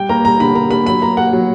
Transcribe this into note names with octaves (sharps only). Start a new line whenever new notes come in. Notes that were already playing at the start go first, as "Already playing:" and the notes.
Already playing: G3 G5
A#3 A#5
G3 A#5
D3 B5
A#3 A#5
A#3 B5
F#3 B5
A#3 A#5
A#3 F#5
F#3